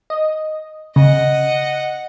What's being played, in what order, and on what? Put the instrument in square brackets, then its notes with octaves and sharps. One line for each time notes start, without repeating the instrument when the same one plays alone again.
[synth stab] D#5
[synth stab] C#3 [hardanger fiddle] D#5 F#5